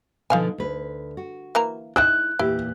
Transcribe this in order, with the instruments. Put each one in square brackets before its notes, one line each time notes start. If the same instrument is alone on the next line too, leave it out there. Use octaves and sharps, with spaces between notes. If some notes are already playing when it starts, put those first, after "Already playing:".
[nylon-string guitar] B2 D3 F3 [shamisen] D#4 F5 G#5
[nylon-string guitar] D2 B4
F#4
[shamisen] E3 A#3 A#5
[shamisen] D#4 E5 G5 [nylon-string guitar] E4 [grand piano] F#6
[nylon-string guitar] E2 A#2 G4 [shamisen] E4